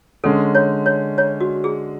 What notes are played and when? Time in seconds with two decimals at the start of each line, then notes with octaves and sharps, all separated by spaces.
0.24 D3 G#3 C#4 A4
0.55 C#5
0.86 C#5
1.18 C#5
1.40 F#4
1.64 G#4